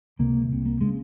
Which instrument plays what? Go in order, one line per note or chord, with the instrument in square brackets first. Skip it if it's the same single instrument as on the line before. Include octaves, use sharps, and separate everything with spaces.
[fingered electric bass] C#2 C3 A#3
C2 C3
A#3
C#3 G#3